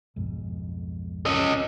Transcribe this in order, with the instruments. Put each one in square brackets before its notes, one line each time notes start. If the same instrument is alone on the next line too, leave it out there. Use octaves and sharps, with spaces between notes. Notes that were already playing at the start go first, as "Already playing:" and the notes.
[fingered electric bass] B1 F2 G#2
[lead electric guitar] C#4 D#5